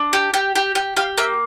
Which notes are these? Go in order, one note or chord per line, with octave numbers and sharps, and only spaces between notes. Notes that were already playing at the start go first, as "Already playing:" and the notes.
Already playing: D4
G4
G4
G4
G4
G4 F5
A#3 E5